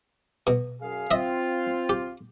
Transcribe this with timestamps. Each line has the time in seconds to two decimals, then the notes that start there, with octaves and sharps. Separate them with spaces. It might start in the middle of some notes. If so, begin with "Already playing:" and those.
0.47 B2
0.81 F#2 G#4 F5
1.11 C4 F4 D#5 E5
1.89 G4